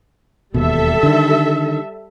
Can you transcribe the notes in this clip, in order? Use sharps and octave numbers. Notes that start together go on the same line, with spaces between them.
E1 D#2 B2 G3 A4 E5
D3 D#3